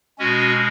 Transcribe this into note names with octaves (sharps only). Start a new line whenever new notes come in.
B2 G#3 C#4 F#4